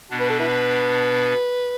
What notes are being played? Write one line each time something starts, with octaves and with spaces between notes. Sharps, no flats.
B2 B3 D4
B4
A4
E4 B4